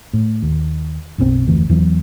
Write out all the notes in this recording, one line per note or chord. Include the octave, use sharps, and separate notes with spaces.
A2
D#2
F#1 B1 A2 C4
F1 D2 E3
E2 E3 F#3